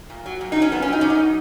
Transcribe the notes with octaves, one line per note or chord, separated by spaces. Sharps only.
A#2
F#3
A#2
F#3 D#4
C#4
A#2 B3
C#4
F#3 D#4
A#2 C#4
D#4
F#3